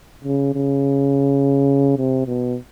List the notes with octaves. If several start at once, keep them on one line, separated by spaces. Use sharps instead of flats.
C#3
C#3
C3
B2